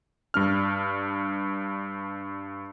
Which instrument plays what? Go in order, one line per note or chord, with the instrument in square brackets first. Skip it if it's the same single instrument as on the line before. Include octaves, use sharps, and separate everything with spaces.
[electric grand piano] G2 D4 F6